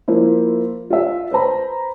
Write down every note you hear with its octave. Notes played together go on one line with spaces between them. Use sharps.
F3 A#3 E4 C5
F4 E5
B4 C5 A#5 B5